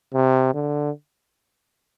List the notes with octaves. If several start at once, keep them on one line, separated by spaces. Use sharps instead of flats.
C3
D3